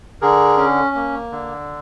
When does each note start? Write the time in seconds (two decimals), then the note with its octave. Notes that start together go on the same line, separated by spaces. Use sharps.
0.21 D3 G#4 A#4
0.57 C#4
0.95 A#3
1.31 D3